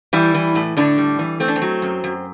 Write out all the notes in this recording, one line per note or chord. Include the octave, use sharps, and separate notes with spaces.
E3 G3 E4
E3
A2
A2 D3 D4
G3
E3
A3 C4
D4
C4
F#3
F#2
F#2